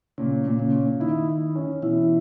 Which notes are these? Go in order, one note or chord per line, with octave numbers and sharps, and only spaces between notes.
A#2 C#3 C#4
A#2
C#3 C#4
A#2
D#3 D#4 E4
E4
C#4
B2 E3 E4